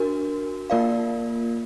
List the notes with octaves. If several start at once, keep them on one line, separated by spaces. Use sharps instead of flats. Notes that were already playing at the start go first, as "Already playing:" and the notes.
Already playing: D4 F#4 A#4
A#3 F4 A#4 D5 F5